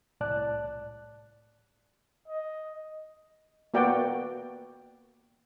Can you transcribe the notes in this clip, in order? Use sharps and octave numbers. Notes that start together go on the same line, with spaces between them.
C2 A2 D5 A5 F#6
D#5
A#3 B3 F#4 D5 G5